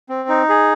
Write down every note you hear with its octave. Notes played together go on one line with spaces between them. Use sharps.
C4
D#4
G#4